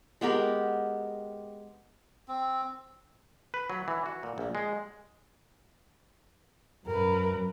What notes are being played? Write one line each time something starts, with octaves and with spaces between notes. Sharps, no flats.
G#3 B3 G4 A#4
C4
B4
F#3
E3
F#4
A#2
A#1
G#3
F#2 A#4 B4